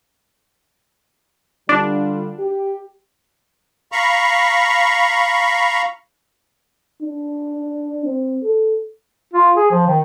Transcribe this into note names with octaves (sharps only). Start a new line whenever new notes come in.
D3 G3 D4 F4
G4
F5 A#5 B5 C#6
D4
C4
A4
F4
G#4
F3
D#3